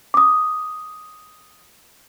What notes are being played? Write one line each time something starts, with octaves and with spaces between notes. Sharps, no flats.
D6 D#6